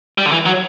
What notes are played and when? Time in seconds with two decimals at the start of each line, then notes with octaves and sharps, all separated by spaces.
0.18 G3
0.26 D3
0.32 E3
0.46 F#3